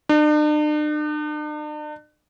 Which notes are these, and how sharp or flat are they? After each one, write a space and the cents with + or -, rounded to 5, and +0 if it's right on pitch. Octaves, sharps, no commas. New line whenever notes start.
D4 +45